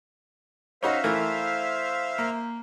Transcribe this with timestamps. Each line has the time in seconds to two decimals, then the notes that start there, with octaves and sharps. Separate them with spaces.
0.83 C#4 D#4 F#4 C5 E5 F5
1.04 E3 A3 A#4
2.18 A#3